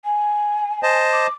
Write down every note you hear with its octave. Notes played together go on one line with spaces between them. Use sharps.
G#5
C5 D#5 A5
D6